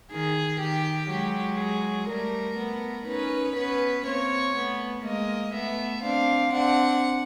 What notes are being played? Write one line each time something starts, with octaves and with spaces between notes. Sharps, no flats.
D#3 G#4
D#3 G4
F#3 G#3 G4
G#4
G3 A3 A#4
A3 B3
C#4 D#4 B4
B3 C#4 B4
A#3 C4 C#5
A3 B3
G#3 A#3 D#5
A3 B3 E5
C4 D4 F5
C4 D4 F#5